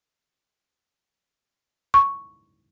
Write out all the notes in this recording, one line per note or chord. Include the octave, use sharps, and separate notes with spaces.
C#6